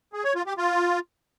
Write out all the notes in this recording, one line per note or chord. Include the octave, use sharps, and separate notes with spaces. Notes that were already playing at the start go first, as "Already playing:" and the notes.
G#4
C#5
F4
G4
F4